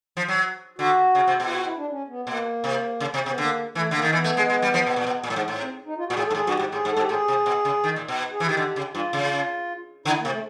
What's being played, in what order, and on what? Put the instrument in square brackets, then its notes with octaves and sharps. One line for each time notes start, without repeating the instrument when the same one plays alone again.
[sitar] F3
F#3
[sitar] D3 [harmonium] F#4
[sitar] C#3
C3
B2
[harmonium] F4
F#4
E4
D4
C#4
B3
[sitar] B2 [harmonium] A#3
[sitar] C3
C#3
C3
[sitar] C3 [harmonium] B3
[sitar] D3 [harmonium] A#3
[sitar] E3 [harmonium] A3
[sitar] D3 [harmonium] A#3
[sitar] D#3
[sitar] E3 [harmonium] B3
[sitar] A3
G#3
G#3
G3
F3
B2
A#2
B2
A#2
A2
G#2
A2
[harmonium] C4
D#4
F4
F#4
[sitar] A#2
[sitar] A2 [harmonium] G#4
[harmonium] A4
[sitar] G#2
[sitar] A2 [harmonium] G#4
[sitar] G2 [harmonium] F#4
[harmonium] G4
[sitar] G#2
[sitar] A2 [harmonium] G#4
[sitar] G#2
[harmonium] A4
[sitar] G#2
[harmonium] G4
[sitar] A2 [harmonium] G#4
[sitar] C3
B2
C#3
D#3
A#2
B2
[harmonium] G#4
[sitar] E3
[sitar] D#3 [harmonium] G4
[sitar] D3
C#3
[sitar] G2 [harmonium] F4
[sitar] C#3
[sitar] D3 [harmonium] E4
[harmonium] A#3
[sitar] C3
[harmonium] A3